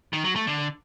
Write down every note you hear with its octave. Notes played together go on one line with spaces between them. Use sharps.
D#3
F#3
A3
D3